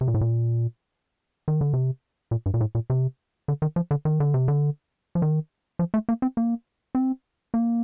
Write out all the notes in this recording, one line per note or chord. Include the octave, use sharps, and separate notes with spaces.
C3
A#2
A2
A#2
D#3
D3
C3
A#2
G2
A#2
A2
A#2
C3
D3
D#3
F3
D3
D#3
D3
C3
D3
F3
D#3
F3
A3
A#3
C4
A#3
C4
A#3